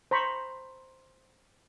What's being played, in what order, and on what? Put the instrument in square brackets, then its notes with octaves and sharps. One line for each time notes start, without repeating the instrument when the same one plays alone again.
[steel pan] C5 A#5 B5 C#6